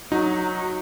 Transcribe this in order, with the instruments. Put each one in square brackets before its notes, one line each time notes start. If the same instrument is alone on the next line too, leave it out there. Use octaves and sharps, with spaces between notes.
[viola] F#3 [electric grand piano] D#4 [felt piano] F#4